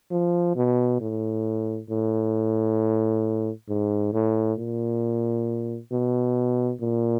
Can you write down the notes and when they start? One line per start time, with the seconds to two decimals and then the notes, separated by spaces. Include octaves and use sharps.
0.11 F3
0.56 B2
1.00 A2
1.90 A2
3.69 G#2
4.13 A2
4.58 A#2
5.92 B2
6.81 A#2